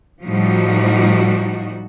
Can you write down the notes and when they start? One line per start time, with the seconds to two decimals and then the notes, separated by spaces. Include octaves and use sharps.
0.24 A2 F3 G3 D#4 F#4